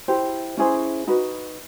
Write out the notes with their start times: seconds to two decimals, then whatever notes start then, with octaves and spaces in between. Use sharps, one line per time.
0.08 E4 G4 C5
0.57 C#4 E4 G#4 C5
1.07 D#4 F#4 B4